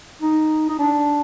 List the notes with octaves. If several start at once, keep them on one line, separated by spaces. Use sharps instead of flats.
D#4
D#4
D4